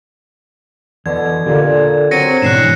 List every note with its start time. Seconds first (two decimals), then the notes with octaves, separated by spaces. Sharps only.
1.06 E2 B2 D3 G#6
1.46 A#2 D3 G4 A4 D5
2.11 F#3 C4 A#6 C#7 D#7
2.42 G#2 B2 E3 D4 F#6 C7 E7